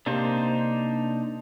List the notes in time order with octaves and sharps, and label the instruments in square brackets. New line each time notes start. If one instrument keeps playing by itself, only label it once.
[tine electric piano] C3 A#3 [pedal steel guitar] D4 D#4 C5